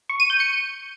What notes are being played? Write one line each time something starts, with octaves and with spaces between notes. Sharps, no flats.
C#6
D#7
G6
C#7